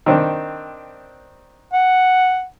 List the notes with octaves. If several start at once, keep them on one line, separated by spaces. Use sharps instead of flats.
D#3 C4 D4
F#5